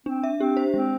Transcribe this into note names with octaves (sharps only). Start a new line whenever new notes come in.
C4 D4
E5
C4 G4
C5
G#3 C4